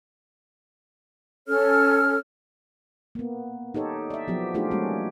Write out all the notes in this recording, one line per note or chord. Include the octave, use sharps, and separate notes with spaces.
C#4 A4 C#5 F6
A#3 B3
D#4 G4 A4 C#5
D5 E5
F3 F#3 B3 G4
A3 D4 D#4 F4 G4 G#4
G3 G#3 A#3 C#4 F#4